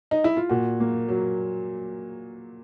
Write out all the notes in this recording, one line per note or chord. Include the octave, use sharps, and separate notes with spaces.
D#4
E4
F4
A#2 F#4
A#3
F#3